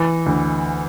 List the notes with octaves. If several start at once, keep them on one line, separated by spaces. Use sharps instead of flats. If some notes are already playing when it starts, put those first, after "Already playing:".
Already playing: E3
D2